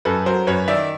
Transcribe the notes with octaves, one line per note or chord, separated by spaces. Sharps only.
F#2 A4 B4
F#3 A#4 C5
F#2 B4 C#5
D#3 D5 E5